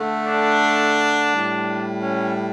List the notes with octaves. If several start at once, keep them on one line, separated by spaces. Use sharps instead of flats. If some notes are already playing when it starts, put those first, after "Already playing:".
Already playing: D3 A3
D4
A2 G3
C#4